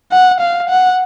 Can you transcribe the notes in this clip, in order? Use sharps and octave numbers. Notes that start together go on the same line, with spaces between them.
F#5
F5
F#5